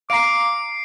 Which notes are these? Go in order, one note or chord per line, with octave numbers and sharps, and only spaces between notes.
F5 A#5 D6 C7 D7